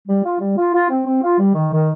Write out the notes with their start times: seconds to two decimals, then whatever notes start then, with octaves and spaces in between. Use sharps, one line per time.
0.08 G3
0.24 F4
0.40 G3
0.57 F4
0.74 F4
0.90 C4
1.06 C4
1.23 F4
1.39 G3
1.55 D#3
1.72 D#3